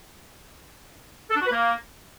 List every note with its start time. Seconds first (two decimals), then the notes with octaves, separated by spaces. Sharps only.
1.30 A4
1.35 D4
1.40 F#4
1.46 B4
1.51 A#3